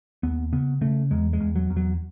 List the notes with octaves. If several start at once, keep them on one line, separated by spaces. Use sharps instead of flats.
D#2 B3
C#3 B3
C#3 A3
E2 G#3
G#3
E2
F#3
E2
F#3